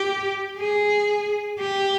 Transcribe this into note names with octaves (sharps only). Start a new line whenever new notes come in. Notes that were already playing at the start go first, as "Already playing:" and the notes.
Already playing: G4
G#4
G4